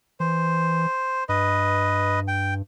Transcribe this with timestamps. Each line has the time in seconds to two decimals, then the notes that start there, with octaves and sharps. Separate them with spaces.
0.20 E3 C5
1.29 G2 B4 D#5
2.28 G5